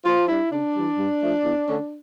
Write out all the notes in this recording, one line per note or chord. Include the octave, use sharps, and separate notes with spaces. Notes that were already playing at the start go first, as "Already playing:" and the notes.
A#2 F3 F4
G3 D4 E4
C#3 D4
E3 G3
G2
F3 A3
E2
D3 A3 C#4